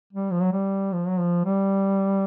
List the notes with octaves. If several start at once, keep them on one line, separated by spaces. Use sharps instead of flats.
G3
F3
F#3
G3
F3
F#3
F3
G3